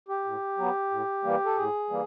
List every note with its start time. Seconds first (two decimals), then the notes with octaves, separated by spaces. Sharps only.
0.08 G4
0.25 A2
0.58 F#3 B3
0.91 A2
1.24 E3 G3 A#3
1.45 A4
1.57 A2 G#4
1.90 E3 G3 A#3